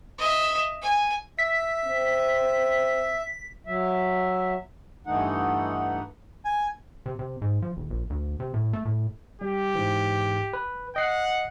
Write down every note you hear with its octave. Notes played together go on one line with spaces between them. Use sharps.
D#5 E5
G#5
E5 B6
C4
F#3 E5
G2 E3 A3 D#4 F#5
G#5
C3
C3
G#2
F3
D#1
A#1
D2
C3
A2
A3
A2
G3 G4
G#2 E3
B4
D#5 F#5 C7